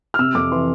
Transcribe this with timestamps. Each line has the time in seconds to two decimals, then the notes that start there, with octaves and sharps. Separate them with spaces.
0.14 F6
0.19 C3 E6
0.35 F2 D6
0.52 E3 C6